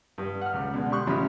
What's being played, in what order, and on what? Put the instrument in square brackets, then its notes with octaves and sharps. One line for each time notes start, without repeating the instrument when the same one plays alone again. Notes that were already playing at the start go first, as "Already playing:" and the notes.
[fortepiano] G2 D#6
F#5 F6
C#2 C#3
B2 D3 G#3 D4
G4 C6 C#6 F#6
A1 C#3 F3 C#4 B5